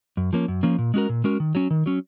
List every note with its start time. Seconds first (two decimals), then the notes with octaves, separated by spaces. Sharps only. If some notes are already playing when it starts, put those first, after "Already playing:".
0.17 F#2
0.33 F3 A#3 C#4
0.48 F#2
0.63 F3 A#3 C#4
0.78 A#2
0.94 G#3 C#4 F#4 A#4
1.09 A#2
1.24 G#3 C#4 F#4 A#4
1.40 D#3
1.55 F#3 C#4
1.70 D#3
1.86 F#3 C#4